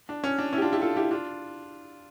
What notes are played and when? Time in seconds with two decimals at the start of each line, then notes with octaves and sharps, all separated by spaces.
0.09 D4
0.24 C#4
0.38 D4
0.53 C#4 E4
0.58 G4
0.62 D4 F4
0.73 E4 G4
0.81 F4 A4
0.97 E4 G4
1.11 D4 F4